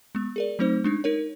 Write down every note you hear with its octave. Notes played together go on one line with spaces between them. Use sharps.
G#3 B3
G#4 A#4 D5
F#3 A3 C4 D#4 C5
G#3 D4 D#4
D#4 A#4 C#5